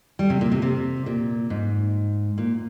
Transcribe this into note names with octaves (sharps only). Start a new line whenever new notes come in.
G3
C3
A#2
C3
C3
A#2
G#2
A#2